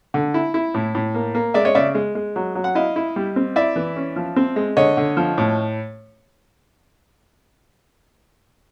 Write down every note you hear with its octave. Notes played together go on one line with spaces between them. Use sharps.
D3
E4
E4
A2
A2
A#3
A#3
G#3 D5 E5
C#5 D#5
C#3 D5 E5
G#3
G#3
F#3
F#3
F#5
E4 D#5 F5
E4
G3
C4
E4 D5 E5
E3
C#4
F3
C4
G#3
D3 C#5 D#5
D3
F3
A2